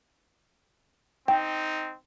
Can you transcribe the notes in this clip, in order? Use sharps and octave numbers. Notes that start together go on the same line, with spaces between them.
C4 D#4 G5